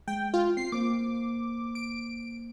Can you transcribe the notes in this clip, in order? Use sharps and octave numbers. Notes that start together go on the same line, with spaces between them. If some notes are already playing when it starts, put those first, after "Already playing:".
G#3 G5
F4
C4 C7
A#3 C5 D6
D7